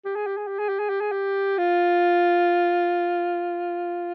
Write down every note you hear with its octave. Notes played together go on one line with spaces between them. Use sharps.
G4
G#4
G4
G#4
G4
G#4
G4
G#4
G4
G#4
G4
F4